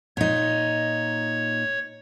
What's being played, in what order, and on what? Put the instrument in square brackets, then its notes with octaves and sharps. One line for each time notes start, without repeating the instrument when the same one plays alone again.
[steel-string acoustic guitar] A#2 D#4 [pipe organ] C#5